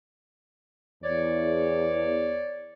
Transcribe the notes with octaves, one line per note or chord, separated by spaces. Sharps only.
E2 C#5 D5